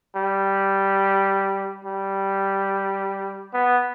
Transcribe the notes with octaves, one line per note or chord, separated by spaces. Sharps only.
G3
G3
B3